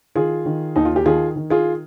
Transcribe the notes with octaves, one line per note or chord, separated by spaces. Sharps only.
D#3 F4 G#4
D#3
D#2 D#4
F4
G4
D#3 F4 G#4
D#3
F4 G#4